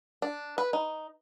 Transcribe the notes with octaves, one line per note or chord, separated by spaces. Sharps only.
D4
B4
D#4